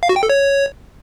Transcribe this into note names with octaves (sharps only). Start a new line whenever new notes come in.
F5
F#4
G5
A4
C#5